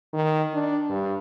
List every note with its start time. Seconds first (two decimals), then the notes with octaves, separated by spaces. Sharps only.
0.13 D#3
0.54 D4
0.90 G2